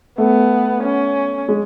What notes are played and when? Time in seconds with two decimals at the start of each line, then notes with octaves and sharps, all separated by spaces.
0.18 A3 B3
0.83 C#4
1.48 G#3